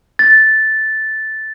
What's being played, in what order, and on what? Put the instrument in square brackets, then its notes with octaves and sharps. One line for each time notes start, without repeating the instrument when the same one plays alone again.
[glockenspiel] A6